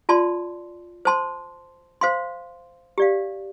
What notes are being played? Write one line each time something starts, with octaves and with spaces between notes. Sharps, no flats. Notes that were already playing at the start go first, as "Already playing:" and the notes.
F4 D5 A5 C6
C5 A5 C6
C5 F5 C6
G4 D5 F5